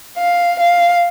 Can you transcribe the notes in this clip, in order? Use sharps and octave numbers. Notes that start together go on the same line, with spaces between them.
F5
F5